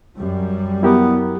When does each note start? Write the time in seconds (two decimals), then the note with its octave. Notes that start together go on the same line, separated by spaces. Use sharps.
0.17 F#2 G3
0.83 B3 E4 G4 A#4